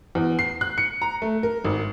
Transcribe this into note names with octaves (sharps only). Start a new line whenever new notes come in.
E2
C7
F#6
C#7
A#5
A3
A#4
G#1